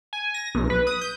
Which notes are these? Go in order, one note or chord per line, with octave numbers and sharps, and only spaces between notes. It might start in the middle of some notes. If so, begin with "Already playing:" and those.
G#5
A#6
B1
B4
D#6
G6